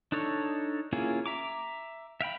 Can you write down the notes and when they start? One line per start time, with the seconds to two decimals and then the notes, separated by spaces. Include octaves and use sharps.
0.12 D4 D#4 A4 C#5
0.93 A#3 C#4 E4 F4 G#4
1.26 E5 A#5 D6
2.21 E5 F5 G5 B5